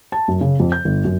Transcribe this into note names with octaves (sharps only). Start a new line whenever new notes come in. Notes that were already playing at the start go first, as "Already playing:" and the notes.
A5
F#2
C#3
F2
G6
G1
F#2